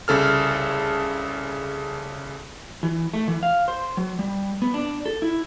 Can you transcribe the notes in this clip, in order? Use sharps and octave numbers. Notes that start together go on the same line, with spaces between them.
C2 C#3 A4 F6
E3
A3
E3
F5
C5
F#3
G3
B3
D4
A4
E4